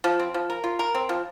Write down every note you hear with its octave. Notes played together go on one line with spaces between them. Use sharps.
F3
C4
F3
A#4
F4
A#4
C4
F3